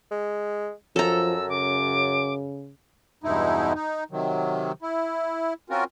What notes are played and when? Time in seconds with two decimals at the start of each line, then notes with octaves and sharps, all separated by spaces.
0.11 G#3
0.96 F#2 F3 A4 A#5 E6
1.49 C#3 D6
3.24 E2 G2 B2 G#3 D#4 E4
3.74 D#4
4.11 C3 D#3 F#3
4.82 E4
5.70 C4 C#4 F4 F#4 A#4